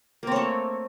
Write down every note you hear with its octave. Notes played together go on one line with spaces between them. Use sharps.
A3 A#3 C4 C#5